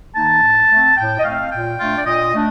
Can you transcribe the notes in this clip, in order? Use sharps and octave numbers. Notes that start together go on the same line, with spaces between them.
D#3 A#3 D#4 A5
A2
A3 C4
A2 G5
D#5
A3 C4 F5
A#2 G5
A3 D4 F4
D5
A#2 D#5
A3 D4